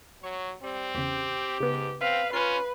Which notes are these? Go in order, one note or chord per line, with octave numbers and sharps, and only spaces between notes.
F#3 C#5
G3 C4
E2 C#3 G4
G#2 C#3 B3
C4 B4 F5
C#4 F4 B4 C7